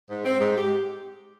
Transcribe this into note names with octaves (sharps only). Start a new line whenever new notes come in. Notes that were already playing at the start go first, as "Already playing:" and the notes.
G#2
C4
G#2
G4